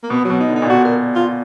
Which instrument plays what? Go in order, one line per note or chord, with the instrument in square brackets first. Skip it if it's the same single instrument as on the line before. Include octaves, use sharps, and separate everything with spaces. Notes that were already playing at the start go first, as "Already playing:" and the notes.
[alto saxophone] A#3
[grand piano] B2 [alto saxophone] B3
[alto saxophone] F#3
[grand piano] B2
[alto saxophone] D#4
[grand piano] D3
[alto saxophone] D#4
[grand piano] A#2
[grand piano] B2 [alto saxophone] F#4
[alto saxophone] A#4
F4